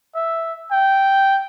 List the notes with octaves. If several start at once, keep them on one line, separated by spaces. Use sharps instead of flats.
E5
G5